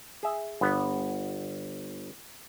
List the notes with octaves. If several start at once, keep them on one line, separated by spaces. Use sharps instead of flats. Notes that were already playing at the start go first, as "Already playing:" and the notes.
G#4 E5
G1 B3